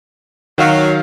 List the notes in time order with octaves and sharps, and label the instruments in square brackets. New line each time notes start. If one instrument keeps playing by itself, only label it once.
[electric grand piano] D#3 F#4 F5 [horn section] F#3